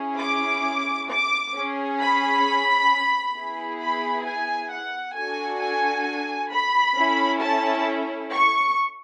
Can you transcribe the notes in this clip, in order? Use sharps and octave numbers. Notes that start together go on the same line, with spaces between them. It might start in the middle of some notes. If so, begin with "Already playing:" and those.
Already playing: C#4 E4 G#4
D6
D6
C#4 G#4
B5
B3 E4 G#4
B5
G#5
F#5
D4 F#4 A4 G#5
G#5
B5
C#4 E4 A4
A5
C#6